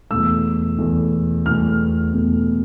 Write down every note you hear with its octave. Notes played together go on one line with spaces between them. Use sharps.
E2 B2 A3 E6
E2 B2 A3
E2 B2 A3 F6
E2 B2 A3